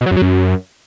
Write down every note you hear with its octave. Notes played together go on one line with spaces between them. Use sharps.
B2
F#3
F#2
F#3
F#2